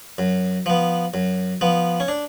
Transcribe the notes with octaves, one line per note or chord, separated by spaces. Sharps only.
F#2
F3 B3
F#2
F3 B3
C#4
D4